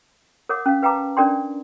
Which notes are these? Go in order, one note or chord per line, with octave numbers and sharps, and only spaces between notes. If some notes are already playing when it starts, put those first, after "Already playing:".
A#4 C#5 F#5 D6
C#4 F5
B4 F5 G5 A5 A#5 D6
C#4 D4 A#4 D5 G5 C6